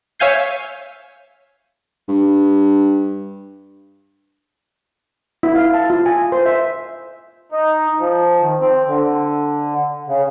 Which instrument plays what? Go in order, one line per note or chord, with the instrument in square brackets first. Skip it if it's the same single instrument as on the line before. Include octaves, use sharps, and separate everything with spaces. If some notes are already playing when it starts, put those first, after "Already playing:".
[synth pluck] C#5 E5 F5 G#5 G6 C7
[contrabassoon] G2
[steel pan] E4
F5
A5
F4
G#5
C5
E5
[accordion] D#4
F3
D#3
C4
D3
C#3